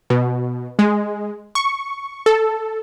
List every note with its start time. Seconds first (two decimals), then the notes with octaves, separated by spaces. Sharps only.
0.10 B2
0.79 G#3
1.55 C#6
2.26 A4